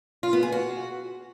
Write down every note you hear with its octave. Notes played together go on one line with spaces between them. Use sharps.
F4
B3
G#4
F#4